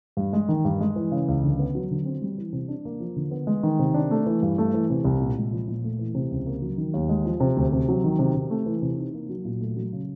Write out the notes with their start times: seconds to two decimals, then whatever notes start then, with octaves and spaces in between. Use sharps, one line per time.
0.17 G2
0.33 G#3
0.49 D#3
0.65 G2
0.81 G#3
0.96 E3
1.12 C#3
1.28 C#2
1.44 D3
1.59 B3
1.75 F#3
1.91 D3
2.05 C4
2.21 G3
2.38 E3
2.53 C3
2.68 D4
2.85 A#3
3.00 F3
3.16 D3
3.31 B3
3.47 G#3
3.63 D#3
3.79 C3
3.94 D4
4.11 A3
4.26 E3
4.42 G2
4.58 A3
4.74 E3
4.90 C3
5.05 C2
5.21 A#2
5.37 G#3
5.53 F3
5.68 A#2
5.84 A3
5.99 E3
6.15 C3
6.31 C#2
6.47 A#3
6.62 F#3
6.77 D#3
6.94 D#2
7.09 G#3
7.25 F3
7.40 C3
7.57 D2
7.72 C3
7.88 F#3
8.04 D#3
8.19 C3
8.35 C3
8.51 A3
8.66 E3
8.82 C3
8.98 D#4
9.14 A#3
9.29 F#3
9.45 A#2
9.61 A3
9.76 F#3
9.93 C#3